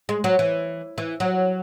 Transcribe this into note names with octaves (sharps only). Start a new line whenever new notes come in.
G#3
F#3
E3
E3
F#3